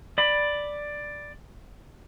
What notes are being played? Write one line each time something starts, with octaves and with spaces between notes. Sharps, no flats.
D5 B5